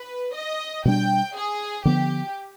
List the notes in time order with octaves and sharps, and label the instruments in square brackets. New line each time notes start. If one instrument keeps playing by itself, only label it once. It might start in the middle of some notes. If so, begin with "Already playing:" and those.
Already playing: [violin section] B4
D#5
[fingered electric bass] B2 G3 D4 [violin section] G5
[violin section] G#4
[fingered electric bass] D3 F3 B3 [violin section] G4